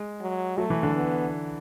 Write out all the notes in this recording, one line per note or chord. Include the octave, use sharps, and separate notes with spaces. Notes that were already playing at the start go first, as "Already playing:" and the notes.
Already playing: G#3
F#3
F#3 A3
E3
D3
B3